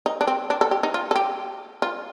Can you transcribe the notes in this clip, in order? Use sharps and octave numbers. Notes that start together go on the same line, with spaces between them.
D#4
D4
C4
D4
A4
G4
D#4
F4
A4
G4
F4